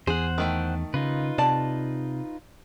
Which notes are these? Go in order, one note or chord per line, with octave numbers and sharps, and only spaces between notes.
E2 G#4 C5 F#5
D#3 A3 G5
C#3 D#4 F4 B4
C3 D5 A5